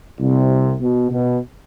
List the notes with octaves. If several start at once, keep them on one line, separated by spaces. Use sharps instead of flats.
C2 C3
B2
B2